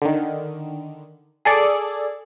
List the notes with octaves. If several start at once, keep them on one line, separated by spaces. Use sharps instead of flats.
D3 D#3
G#4 A4 D5